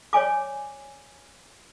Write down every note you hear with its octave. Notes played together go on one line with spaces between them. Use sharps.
C#5 D5 G#5 D6